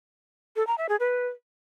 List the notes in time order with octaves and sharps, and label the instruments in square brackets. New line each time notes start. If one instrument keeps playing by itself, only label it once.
[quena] A4
A#5
E5
G#4
B4